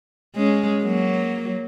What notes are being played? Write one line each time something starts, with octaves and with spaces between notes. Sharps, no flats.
G#3 C#4
F#3 A#3